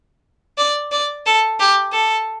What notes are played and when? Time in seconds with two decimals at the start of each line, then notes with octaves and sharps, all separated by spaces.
0.58 D5
0.92 D5
1.26 A4
1.60 G4
1.92 A4